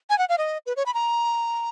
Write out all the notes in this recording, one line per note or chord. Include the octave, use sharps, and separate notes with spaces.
G#5
F#5
F5
D#5
B4
C#5
B5
A#5